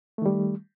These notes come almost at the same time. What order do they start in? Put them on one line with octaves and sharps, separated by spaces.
A3 D#3 G3